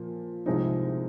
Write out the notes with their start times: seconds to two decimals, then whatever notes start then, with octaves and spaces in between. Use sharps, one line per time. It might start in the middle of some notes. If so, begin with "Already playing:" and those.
Already playing: A#2 F3
0.46 C2 C3 F3 G#3 C4 D#4